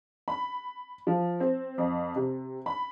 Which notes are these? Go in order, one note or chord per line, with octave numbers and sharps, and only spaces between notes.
B5
F3
C4
F2
C3
B5